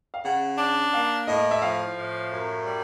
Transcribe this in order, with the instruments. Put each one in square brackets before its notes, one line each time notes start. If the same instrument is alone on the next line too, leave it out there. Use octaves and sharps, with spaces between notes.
[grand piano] F5
[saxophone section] C#3 [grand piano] F#5
[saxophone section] D4
[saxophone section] A#3 [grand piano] F5
[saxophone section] A2 [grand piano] D#5
[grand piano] E5
[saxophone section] F3 [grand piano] F5
[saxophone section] A2
F#2
G3